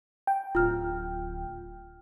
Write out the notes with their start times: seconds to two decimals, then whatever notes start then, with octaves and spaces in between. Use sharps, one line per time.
0.27 G5
0.55 D1 F4 F6